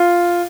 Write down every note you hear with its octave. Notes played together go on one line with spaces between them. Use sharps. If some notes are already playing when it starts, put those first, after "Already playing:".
Already playing: F4